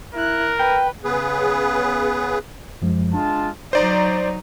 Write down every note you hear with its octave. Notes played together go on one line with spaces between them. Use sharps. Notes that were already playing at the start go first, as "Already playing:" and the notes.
E4 A#4 F#6
B4 G5
C#3 B3 G#4 B4
F#2 F3 G#3
G#3 D4 F4 A5
F#3 D#4 C5 D5 A#5